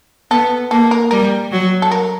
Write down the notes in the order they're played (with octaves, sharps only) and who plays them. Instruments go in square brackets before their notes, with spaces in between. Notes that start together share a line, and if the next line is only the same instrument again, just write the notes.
[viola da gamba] B3 [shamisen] A4
[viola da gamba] A#3 [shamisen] A4
[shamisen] A#4
[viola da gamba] G3 [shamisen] A#4
[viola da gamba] F#3
[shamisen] A4
A#4